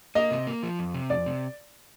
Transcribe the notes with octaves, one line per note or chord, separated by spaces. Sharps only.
A#3 D#5
C3
A#3
F3
F2
C3
F2 D5
C3